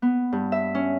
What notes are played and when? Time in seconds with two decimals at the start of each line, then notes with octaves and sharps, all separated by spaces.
0.02 B3
0.32 G2
0.52 E5
0.75 C#4